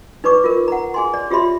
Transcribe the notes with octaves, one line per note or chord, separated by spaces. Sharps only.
D#4 B4 D5 C#6 D6
F4 A#4
F#5 A#5
G#4 G#5 C6
D5
F4 G4 C#5 E5 B5 C6